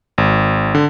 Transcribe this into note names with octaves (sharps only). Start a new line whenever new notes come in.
G#1
D3